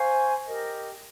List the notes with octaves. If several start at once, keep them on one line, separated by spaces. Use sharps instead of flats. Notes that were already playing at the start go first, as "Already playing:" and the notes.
Already playing: C5 F5 G#5 C#6
G4 A#4 D#5